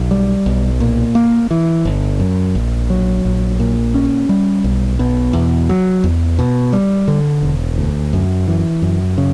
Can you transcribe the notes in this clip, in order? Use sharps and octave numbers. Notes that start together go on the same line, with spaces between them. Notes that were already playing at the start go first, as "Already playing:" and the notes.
Already playing: B1
G3
B1
A#2
A#3
E3
G1
F#2
A#1
F#3
A#1
A#2
C#4
G3
B1
B2
E2
F#3
E2
B2
G3
D3
E1
D2
F#2
E3
F#2
C#3